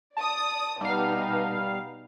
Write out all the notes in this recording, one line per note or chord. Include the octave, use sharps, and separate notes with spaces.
D5 A5 D#6
B2 G3 B3 D#4 F5